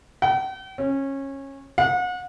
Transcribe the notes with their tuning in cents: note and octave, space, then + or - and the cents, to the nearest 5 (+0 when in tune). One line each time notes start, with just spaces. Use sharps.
G5 -45
C#4 -20
F#5 -35